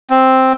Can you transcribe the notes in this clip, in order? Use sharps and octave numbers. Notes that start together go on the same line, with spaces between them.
C4